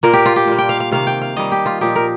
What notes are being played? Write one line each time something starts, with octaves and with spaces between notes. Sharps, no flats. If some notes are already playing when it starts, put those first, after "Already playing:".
A#2 A#3 F4 A#4
G4
F4
G4
A#2 G3 A#3
G5
F5
F5
C3 D#3 A#3 F5
G5
F5
D#3 G3 A#3 D#5
G4
F4
A#2 F3 D#4 G4
A#4